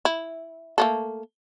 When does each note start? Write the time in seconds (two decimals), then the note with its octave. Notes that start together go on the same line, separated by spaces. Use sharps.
0.05 E4
0.78 A3 A#3 A4